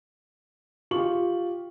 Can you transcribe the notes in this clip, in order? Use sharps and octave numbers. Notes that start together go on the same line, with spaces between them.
F4 G4 C#6 F#7